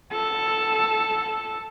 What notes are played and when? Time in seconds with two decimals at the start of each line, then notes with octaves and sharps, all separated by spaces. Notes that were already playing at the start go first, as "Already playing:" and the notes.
0.12 A4